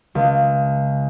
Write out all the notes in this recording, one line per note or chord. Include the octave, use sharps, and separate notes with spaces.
C#2